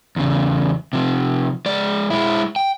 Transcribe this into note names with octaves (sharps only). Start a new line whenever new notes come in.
E2 C#3
C3 F3
G#3 D5
G#3 E4
G5